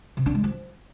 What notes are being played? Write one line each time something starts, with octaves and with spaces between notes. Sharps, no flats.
C3
D4
G#3
F3